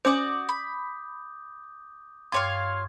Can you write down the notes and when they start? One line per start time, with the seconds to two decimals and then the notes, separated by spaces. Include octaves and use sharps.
0.05 C#4 F#4 C5 D5 D6 D#6 G6
0.49 B5
2.32 G2 F4 C#5 F5 G5 C6 D6 G#6